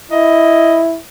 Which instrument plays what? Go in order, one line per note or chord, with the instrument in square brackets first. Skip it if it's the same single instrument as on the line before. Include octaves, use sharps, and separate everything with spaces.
[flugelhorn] E4 [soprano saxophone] D#5